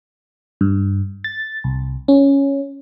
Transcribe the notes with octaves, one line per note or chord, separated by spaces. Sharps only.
G2
A6
C2
C#4